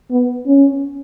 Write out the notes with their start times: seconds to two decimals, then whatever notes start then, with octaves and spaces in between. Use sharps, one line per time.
0.11 B3
0.46 C#4